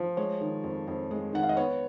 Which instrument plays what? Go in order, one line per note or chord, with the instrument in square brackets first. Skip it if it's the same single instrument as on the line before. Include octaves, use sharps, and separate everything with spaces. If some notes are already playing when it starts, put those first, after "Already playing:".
Already playing: [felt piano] F3
G#3 C#5
D#3
F2
F2
G#3
D#3 F#5
F5
D#5
B3 C#5